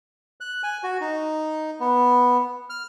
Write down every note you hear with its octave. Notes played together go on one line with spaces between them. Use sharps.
F#6
G#5
F#4
D#4
B3
F6